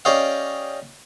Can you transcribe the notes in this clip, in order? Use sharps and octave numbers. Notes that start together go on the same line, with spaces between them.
C#4 G4 D5 D#5 F5